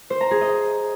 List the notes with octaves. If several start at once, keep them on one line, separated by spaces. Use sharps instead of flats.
C5
A#5
G#4
D#5